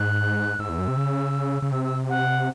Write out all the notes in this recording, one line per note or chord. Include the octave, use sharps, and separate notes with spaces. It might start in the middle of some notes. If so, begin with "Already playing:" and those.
Already playing: G#2 F#6
G#2 E6
E2
F#2
C3
C#3
C#3
C3 E6
E6
F#5